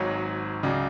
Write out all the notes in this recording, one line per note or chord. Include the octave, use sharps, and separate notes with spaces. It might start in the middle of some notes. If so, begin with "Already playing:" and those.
Already playing: G#1 G#2 F#3 C#5
C#2 C#3 F#3 D5